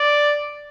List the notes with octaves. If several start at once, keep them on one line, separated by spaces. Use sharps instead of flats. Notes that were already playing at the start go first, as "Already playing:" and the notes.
Already playing: D5